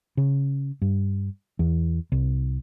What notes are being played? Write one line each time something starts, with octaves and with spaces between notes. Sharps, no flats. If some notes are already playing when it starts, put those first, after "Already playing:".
C#3
G2
E2
C2